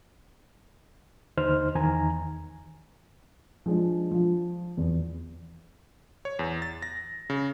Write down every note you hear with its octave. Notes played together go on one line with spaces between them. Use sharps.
D#2 D3 D#4 C5 F6
E2 D#3 G#5 A#5
F3 G#3 D4
F3 F4
E2
C#5
E2
A6
A#6
C#3